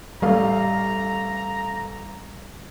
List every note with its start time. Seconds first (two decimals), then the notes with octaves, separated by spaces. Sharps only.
0.22 A1 G3 A3 F5 A#5